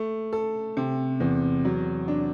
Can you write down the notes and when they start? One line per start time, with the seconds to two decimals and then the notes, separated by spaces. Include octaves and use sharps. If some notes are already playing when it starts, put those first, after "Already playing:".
Already playing: A3
0.33 A4
0.77 C3
1.20 E2
1.65 F#3
2.08 D4